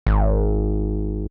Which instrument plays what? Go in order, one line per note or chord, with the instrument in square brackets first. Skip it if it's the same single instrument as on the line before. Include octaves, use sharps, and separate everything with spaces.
[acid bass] G#1